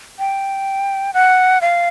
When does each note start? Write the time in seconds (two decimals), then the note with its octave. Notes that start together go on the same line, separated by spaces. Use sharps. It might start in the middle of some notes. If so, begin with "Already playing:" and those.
0.19 G5
1.14 F#5
1.61 F5